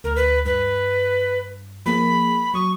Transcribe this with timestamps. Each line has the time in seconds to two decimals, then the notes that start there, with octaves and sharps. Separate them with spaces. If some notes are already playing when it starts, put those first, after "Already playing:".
0.04 D2 A#4
0.16 B4
0.45 G2 B4
1.86 F3 A#3 G#4 B5
2.54 F#3 C#6 D#6